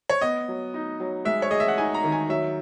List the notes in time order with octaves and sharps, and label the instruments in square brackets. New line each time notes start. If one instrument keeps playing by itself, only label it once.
[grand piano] C#5
[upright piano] B3 [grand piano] D#5
[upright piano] F#3
D#4
F#3
[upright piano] G#3 [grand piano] E5
[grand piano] C#5
[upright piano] G#4 [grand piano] D#5
[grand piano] E5
F#5
[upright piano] D#4 [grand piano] G#5
[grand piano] A#5
[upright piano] D#3
[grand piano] G#5
[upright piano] F#3 [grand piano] E5